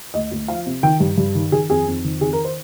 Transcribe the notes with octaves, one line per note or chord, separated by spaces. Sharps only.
D2 D#5
D2
F3 F5
C3
D#3 G5
G2
G2
D#3
D#3 G#4
F2 G#4
F2
D#3
D#3 G#4
A#4
C5